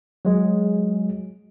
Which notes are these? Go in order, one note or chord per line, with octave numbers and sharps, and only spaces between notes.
F#3 G#3 G#4